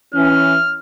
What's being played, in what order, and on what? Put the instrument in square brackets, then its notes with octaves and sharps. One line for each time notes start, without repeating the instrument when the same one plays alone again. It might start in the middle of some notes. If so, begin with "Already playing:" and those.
[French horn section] E3 C#4 [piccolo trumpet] F6